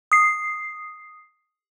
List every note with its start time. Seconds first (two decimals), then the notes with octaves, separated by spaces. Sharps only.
0.12 D#6 C7